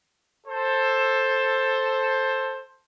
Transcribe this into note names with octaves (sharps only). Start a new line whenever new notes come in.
A4 C5